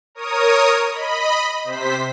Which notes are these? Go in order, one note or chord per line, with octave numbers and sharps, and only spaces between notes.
A#4 C#5 D#6
D#5 B5
C3 C5 B6